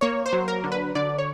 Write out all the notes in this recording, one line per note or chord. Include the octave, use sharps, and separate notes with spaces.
A#3 C#5
C5
F#3
A#4
D3
B4
D3 D5
C#5